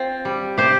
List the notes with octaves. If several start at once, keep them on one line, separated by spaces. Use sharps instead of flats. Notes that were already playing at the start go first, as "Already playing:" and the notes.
Already playing: C4 F4
G3
C3 G4 C5